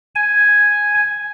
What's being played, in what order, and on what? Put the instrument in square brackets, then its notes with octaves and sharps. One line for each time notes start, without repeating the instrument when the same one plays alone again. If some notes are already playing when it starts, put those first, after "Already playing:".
[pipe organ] G#5